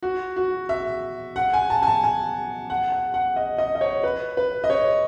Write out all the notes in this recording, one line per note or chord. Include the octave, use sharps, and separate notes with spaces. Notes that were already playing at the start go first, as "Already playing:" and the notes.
F#4
F#4
E5
F#5
G#5
A5
G#5
A5
G#5
F#5
F#5
F#5
D#5
D#5
D#5
C#5
B4
B4
D#5
C#5